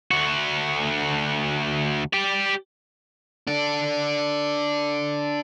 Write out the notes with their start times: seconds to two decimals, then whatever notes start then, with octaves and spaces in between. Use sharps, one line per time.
0.11 D2 F#4
2.13 G4 D5
3.47 D4 A4